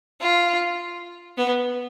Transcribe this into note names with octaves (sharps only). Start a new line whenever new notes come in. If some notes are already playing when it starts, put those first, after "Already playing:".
F4
B3